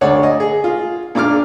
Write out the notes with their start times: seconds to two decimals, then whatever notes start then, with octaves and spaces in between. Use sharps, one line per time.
0.01 D2 C#5 D5 F#5
0.23 D#5
0.40 G#4
0.64 F4
1.15 A#2 D4 D6 F6